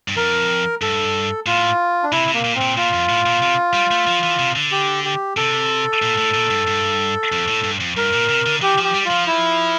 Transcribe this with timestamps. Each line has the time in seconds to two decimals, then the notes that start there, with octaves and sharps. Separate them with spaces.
0.08 G2
0.17 F2 A#4
0.82 G2 A4
1.46 A2 F4
2.03 D4
2.12 C3 E4
2.28 C3
2.34 A#3
2.44 A#2
2.55 C4
2.61 A#2
2.77 A#2 F4
2.93 F2
3.09 A2
3.26 A#2
3.42 C3
3.74 G3
3.91 A3
4.07 F3
4.23 E3
4.39 C3
4.56 D3
4.72 G4
5.04 G4
5.37 C3 A4
6.02 A#2
6.17 A2
6.34 A#2
6.50 G2
6.67 G2
7.32 F2
7.48 A2
7.64 G2
7.80 F2
7.96 G2 A#4
8.13 A#2
8.29 C3
8.46 D3
8.61 E3 G4
8.78 F3
8.84 G4
8.94 G3
9.05 F4
9.10 F3
9.27 E4